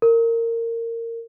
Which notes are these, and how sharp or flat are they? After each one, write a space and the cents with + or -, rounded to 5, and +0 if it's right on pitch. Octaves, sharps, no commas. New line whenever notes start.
A#4 -20